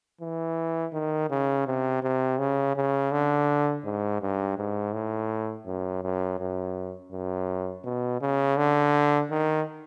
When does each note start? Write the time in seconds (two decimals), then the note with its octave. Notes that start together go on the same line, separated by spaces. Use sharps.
0.21 E3
0.93 D#3
1.30 C#3
1.67 C3
2.03 C3
2.39 C#3
2.76 C#3
3.12 D3
3.84 G#2
4.21 G2
4.58 G#2
4.93 A2
5.66 F#2
6.03 F#2
6.39 F#2
7.12 F#2
7.84 B2
8.21 C#3
8.57 D3
9.31 D#3